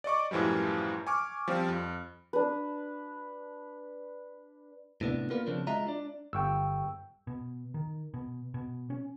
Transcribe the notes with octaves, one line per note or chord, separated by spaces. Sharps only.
D5 D#5 C#6 D6
F#2 A2 E3 F3 G3
G#5 C#6 D6 F6
F3 G3 C4
F2
D4 B4
A2 C3 B3 D4
A#3 B3 F4 A#4 B4
C#3 F3 C4 D4
G#3 F4 D#5 E5 A#5
D4 D5
G1 G5 C#6 E6
B2
D#3
B2
B2
C#4